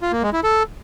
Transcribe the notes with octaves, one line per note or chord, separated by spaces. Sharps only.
F4
A#3
G#3
E4
A4